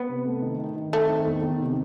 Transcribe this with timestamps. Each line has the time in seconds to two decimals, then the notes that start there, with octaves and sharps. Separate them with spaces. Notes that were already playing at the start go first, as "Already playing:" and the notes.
Already playing: B3
0.09 C3
0.25 A3
0.42 D#3
0.59 D#3
0.76 D#3
0.93 A3 C4
1.09 D#3
1.26 E2
1.43 D#3
1.60 C3